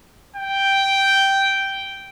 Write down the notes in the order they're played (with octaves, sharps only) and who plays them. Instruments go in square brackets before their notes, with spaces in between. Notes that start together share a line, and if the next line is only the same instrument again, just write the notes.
[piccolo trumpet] G5